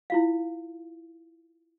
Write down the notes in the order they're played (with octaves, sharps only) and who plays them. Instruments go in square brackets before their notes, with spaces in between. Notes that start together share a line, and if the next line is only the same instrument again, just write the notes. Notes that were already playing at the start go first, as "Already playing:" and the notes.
[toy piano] E4 F4 F5